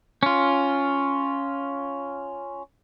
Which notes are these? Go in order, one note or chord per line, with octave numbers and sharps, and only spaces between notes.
C#4 F4